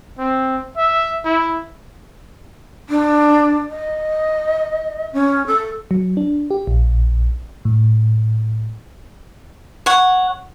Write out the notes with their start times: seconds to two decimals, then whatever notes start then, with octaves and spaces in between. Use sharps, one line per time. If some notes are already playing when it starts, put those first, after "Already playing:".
0.19 C4
0.77 E5
1.25 E4
2.89 D4
3.69 D#5
5.13 C#4
5.47 A4
5.91 F#3
6.17 D4
6.51 G4
6.67 A#1
7.65 A2
9.86 C#5 F#5